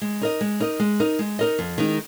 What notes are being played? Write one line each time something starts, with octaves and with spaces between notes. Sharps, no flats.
G#3
D#4 A#4 D#5
G#3
D#4 A#4 D#5
G#3
D#4 A#4 D#5
G#3
D#4 A#4 D#5
F2
D#3 G#3 D#4